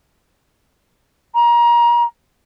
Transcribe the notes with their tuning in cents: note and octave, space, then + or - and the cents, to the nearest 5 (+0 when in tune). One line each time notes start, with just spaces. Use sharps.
A#5 +30